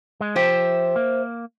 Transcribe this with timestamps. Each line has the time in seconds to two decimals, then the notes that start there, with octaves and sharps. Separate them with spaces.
0.21 G#3
0.36 F3 G4 C5 E5
0.96 A#3